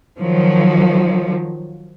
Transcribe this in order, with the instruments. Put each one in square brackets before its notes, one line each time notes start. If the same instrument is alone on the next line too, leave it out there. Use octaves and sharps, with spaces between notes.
[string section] D#3 F3 F#3